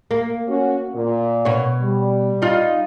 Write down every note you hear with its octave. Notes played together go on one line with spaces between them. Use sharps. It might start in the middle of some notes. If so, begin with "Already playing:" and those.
A#3
C#4 F#4
A#2
B2 C#5
G3
D#4 F4